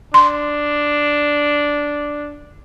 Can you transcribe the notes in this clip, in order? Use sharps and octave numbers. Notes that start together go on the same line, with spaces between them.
D4 C6